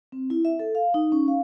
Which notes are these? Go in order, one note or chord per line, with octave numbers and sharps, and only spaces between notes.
C4
E4
E5
A4
F5
D#4
C#4
F5